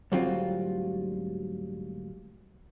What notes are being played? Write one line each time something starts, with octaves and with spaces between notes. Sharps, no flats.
D2 G#2 F#3 G3 C4 F4